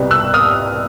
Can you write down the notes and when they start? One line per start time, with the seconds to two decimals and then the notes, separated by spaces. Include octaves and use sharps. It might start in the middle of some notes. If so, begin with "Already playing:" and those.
Already playing: C2 B2 G3 B3
0.11 E6 F#6
0.34 D#6 F6